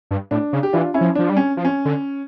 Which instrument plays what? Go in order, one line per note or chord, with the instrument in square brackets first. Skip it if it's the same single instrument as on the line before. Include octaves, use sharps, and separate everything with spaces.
[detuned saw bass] G2
[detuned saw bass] A2 [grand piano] D4
[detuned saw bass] C#3
[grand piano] G4
[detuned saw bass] E3 [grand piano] D4 F4
[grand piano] C#4 E4
[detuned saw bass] F3
[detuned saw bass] F3 [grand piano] D4
[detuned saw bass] G3
[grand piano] C#4
[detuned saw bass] F3
[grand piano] C#4
[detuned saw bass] D3